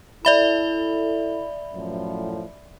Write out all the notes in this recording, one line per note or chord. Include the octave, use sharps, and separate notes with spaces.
E4 A4 D5 E5 B5
F#2 A2 F3